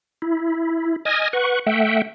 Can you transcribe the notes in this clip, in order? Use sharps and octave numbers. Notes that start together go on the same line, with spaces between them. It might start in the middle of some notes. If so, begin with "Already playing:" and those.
E4
D#5 G#5 D#6 F6 G#6 A#6
B4 F#5 C#6
A3 E5 F#5 G5